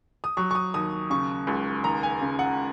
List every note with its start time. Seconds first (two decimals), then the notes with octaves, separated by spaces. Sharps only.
0.24 D#6
0.37 F#3 C#6
0.51 C#6
0.55 D#6
0.74 D#2 D#6
1.10 C#3 C#6
1.47 C#2
1.84 D#2 A#5
2.03 G#5
2.21 C#3
2.39 F#5